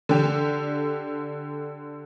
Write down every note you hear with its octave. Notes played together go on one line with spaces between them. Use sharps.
D3 G4